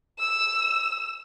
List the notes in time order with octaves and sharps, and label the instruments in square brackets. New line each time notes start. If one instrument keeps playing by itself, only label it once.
[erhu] E6